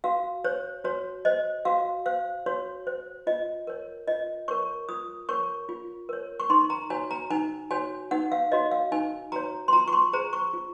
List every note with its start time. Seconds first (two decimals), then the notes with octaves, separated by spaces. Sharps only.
0.04 F#4 F5
0.44 C5 C#5
0.84 F#4 C#5
1.25 C5 D#5
1.65 F#4 F5
2.06 C5 F5
2.46 F#4 C#5
2.87 C5
3.27 F4 D#5
3.67 A#4 C#5
4.08 F4 D#5
4.48 A#4 C#5 C#6
4.89 F4 D#6
5.29 A#4 C#5 C#6
5.69 F4
6.09 A#4 C#5
6.40 C#6
6.50 D#4 C6
6.70 A#5
6.90 F#4 C#5 G#5
7.11 A#5
7.31 D#4 G#5
7.71 F#4 C#5 G#5
8.11 D#4 F#5
8.32 F5
8.52 F#4 C#5 D#5
8.71 F5
8.92 D#4 G#5
9.32 F#4 C#5 A#5
9.68 C6
9.73 F4 A#5
9.88 C#6
9.93 C6
10.13 G#4 C5 A#5
10.33 C#6
10.53 F4